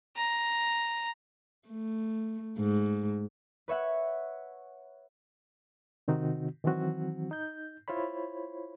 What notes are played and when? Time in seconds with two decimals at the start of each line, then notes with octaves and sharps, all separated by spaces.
0.17 A#5
1.69 A3
2.59 G#2
3.68 B4 C#5 E5 F#5
6.08 C3 D#3 C4 D#4 F#4
6.64 D#3 E3 F#3 C4 F#4
7.31 D#4 G6
7.88 E4 F4 C5 C#5 B5